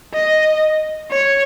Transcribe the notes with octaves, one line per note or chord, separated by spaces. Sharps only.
D#5
C#5